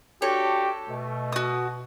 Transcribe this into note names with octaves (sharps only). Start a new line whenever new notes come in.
D4 F#4 G4 A4 C#5
B2 A3
F#4 D#6